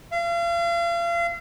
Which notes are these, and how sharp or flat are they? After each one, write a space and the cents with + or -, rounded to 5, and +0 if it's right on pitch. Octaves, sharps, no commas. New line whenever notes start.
F5 -35